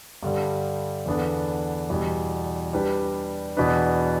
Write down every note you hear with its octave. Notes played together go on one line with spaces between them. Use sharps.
G2 D3 G3
E2 D3 B3 D4 A4
E2 B2 G3
G3 D4 G4 B4
E2 B2 B3 D4 B4